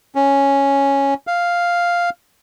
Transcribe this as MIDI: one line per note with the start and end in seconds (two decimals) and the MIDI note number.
0.15 1.14 61
1.27 2.10 77